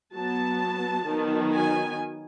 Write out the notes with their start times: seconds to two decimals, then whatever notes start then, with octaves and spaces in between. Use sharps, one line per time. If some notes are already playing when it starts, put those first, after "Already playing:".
0.14 F#3 B3 A5
1.06 D#3 F#3 B3
1.52 G#5